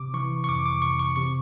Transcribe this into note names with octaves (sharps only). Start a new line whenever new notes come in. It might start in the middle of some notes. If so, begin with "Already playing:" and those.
Already playing: C3 D6
E3 C#6
C#6
F2 D6
D6
C3 C#6
C#6
C3 C#6